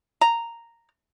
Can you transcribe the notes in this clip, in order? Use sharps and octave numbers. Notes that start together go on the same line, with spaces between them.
A#5